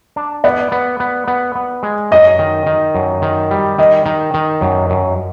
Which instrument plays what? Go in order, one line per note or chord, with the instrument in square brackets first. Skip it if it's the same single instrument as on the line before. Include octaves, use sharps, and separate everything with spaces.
[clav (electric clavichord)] D4
[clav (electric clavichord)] B3 [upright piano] D5
[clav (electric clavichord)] B3
B3
B3
B3
G#3
[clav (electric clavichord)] F#2 [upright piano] D#5
[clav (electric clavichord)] D#3
D#3
F#2
D#3
G3
[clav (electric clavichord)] D#3 [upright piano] D#5
[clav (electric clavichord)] D#3
D#3
F#2
F#2